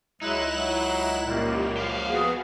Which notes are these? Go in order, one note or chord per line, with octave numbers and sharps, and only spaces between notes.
C#2 F#3 G#3 D#4 E4 F#6 E7
F#3
F#2 A#2 G3 A#3
F3 G4 F5
B3 F#4 G#4